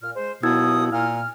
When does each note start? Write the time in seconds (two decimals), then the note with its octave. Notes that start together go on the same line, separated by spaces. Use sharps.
0.02 A#2 F6
0.15 G#3 C5
0.43 D#2 B2 F#3 E4 D#6 E6 G#6
0.92 A#2 F6